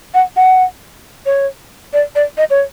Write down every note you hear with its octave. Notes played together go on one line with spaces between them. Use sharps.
F#5
F#5
C#5
D5
D5
D#5
C#5